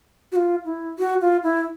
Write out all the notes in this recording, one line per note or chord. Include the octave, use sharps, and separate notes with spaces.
F#4
F4
E4
F#4
F4
E4